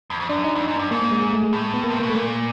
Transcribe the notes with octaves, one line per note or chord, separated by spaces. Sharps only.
E2
F2
F#2 D4
D#4
F2
D4
F#2
G2 D4
G#2 A#3
A#3
G#3
G#3
A3
G#3
A2
B3
A#3
C3
B2 A#3
A3
A#2 A#3